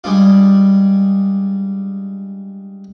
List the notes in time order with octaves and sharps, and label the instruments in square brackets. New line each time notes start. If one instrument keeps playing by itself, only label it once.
[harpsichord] G3 G#3 D4 F4